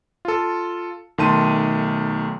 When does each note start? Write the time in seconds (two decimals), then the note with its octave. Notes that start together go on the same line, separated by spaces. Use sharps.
0.25 F4 A4
1.18 B1 D#3 A3 A5 C6 D#7